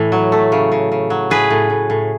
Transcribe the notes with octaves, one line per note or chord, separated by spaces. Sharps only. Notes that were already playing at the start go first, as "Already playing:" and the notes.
Already playing: A2 E3
F#3
A3
C#3
C#3
C#3
F#3
A2 G#4 B4
A2
A2
A2